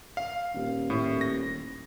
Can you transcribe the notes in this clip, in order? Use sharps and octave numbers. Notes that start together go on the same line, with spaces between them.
F5
D#1
A2
A#6